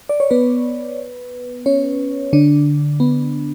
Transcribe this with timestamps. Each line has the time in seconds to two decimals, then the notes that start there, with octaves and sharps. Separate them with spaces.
0.09 D5
0.20 C#5
0.31 B3 B4
1.66 C#4 C#5
2.33 D3 D4
3.00 B3